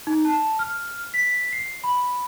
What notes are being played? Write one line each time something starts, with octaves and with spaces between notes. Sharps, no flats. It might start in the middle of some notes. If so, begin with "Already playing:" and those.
D#4
A5
F6
B6
C7
B5